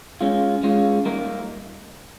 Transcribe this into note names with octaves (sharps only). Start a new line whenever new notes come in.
G#3 C#4 F4
G#3 C#4 F4
G3 A#3 D#4 A#4